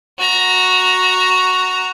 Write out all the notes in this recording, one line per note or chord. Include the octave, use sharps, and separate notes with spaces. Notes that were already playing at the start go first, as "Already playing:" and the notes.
F#4 A#5